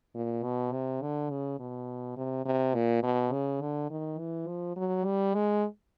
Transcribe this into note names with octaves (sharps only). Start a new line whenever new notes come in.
A#2
B2
C3
D3
C#3
B2
C3
C3
A#2
B2
C#3
D3
D#3
E3
F3
F#3
G3
G#3